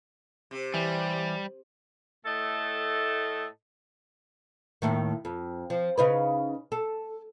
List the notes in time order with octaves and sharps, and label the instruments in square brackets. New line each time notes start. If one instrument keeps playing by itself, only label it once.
[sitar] C3
[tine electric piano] E3 E5 G#5 [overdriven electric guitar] G3
[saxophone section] A2 A3 A4 D#5
[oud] D#2 A2 D#3
F2
F3
C#3 D#4 B4
A4